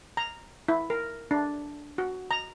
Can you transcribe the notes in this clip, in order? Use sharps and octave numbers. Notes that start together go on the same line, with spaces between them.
A#5
E4
A#4
D4
F#4
A#5